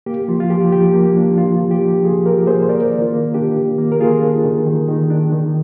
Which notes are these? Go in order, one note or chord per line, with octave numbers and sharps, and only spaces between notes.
A#3 G4
F3 F4
F4
F3 G4
F3 G4
A#3
D4
F3 F4
F3
G4
D4
F3 F4 G#4
F3 G4 A#4
A#3 G#4 C5
C5
A#3 A#4 D5
D#3
F4
A#3
D4 G4
D#3
A#3
A#4
D#3 F4 G#4
D4
D#3
D#3
D#3
D4
D#3